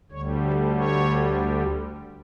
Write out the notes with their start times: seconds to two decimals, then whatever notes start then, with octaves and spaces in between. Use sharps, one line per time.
0.11 D2 D3 G3 C#5
0.42 A4
0.74 C#5